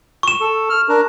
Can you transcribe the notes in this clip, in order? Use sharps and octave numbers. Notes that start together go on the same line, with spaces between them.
C#6 E7
A4
F6
D4 A#4